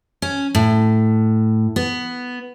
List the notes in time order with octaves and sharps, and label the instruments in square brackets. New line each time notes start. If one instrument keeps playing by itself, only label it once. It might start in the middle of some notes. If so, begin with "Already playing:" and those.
[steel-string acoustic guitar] C#4
A2
B3